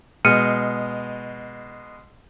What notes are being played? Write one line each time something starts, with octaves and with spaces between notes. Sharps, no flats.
B2 G#3 F6 C#7 D#7